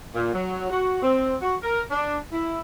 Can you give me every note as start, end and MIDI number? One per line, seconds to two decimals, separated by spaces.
0.15 0.33 46
0.33 0.67 54
0.70 0.99 66
1.02 1.35 60
1.42 1.56 66
1.63 1.83 70
1.90 2.17 62
2.32 2.59 64